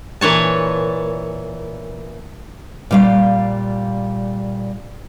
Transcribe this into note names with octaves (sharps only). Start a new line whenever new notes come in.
A#2 E3 C#5 A5
A#2 G3 F5